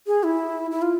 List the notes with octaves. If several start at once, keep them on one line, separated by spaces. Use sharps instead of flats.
G#4
E4
E4
F4